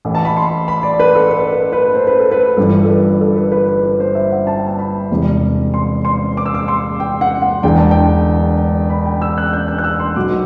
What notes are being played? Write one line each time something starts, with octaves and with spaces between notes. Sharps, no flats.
A1 A2 E3
A5
B5
C6
B5
D5
B4
A4
B4
B4
B4
C5
B4
A4
B4
G1 G2 E3 A4
A4
B4
A4
B4
B4
B4
B4
C5
E5
F#5
A5
G5
A5
B5
E1 E2 C3
C6
C6
D6
E6
D6
C6
G5
F#5
F#5
E1 E2 D3 G5
A5
G5
B5
G5
E6
F#6
G6
F#6
F#6
E6
C6
B1 B2 D6